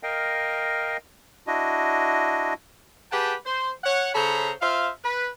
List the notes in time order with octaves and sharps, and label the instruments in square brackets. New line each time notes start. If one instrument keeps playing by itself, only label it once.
[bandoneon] A#4 D#5 F5 G5
D4 E4 F#4 D#5
[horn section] G4 G#4 B4 F#5 G5 A5
C5
C#5 F#5
C#3 A4 C5 C#5 A#5 B5
F4 C5 E5 F5
B4